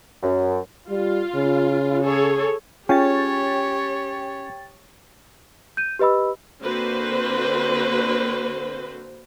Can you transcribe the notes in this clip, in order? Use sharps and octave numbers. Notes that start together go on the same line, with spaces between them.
F#2
G3 F4
C#3
G#4 A4 C#5
C#4 F4 G4 G#4 C#5 G5 A6
G6 D#7
G4 B4 D#5 B5 E6
D3 A#3 C4 F#4 B4 C5